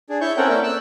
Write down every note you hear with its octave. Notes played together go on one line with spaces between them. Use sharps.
D4 G#4
E4 C#5 C#6 G6
C4 C#4 A4 A#4 F#5 G5
A#3 A4 C#5 D5 E5 G5
E6 F#6